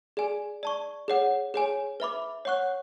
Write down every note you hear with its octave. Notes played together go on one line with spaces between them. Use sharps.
G#4 D5 G#5
D5 A5 C#6
G#4 C#5 F#5
G#4 C#5 G#5
B4 E5 B5 D6
C#5 F#5 C#6 F#6